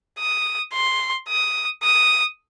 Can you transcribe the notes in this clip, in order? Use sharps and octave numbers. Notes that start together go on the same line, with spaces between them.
D#6
C6
D#6
D#6